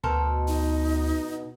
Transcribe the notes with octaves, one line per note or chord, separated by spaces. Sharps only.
D2 B2 A4 A#4 C5
D#4